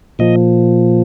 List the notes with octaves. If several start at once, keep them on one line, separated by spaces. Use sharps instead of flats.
A#2 F3 D#5